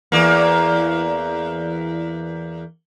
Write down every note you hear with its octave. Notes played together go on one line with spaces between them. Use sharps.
E2 A#3